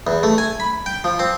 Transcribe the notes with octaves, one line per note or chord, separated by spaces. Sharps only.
E2
A3
G#5
B5
G5
F3
C4